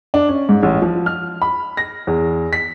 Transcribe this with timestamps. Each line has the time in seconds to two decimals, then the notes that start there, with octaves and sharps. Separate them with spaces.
0.14 D4
0.29 C#4
0.49 G#2
0.63 A1
0.82 F3
1.06 F6
1.42 B5
1.77 A#6
2.07 E2
2.53 B6